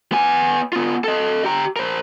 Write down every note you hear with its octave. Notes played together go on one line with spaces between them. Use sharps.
B3 G#5
B3 F4
A4 D#5
G4 A#5
A#4 C5